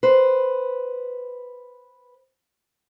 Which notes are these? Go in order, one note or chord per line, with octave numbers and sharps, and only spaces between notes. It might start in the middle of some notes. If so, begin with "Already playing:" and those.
B4 C5